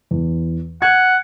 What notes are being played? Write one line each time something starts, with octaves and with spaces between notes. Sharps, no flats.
E2
F#5 G#6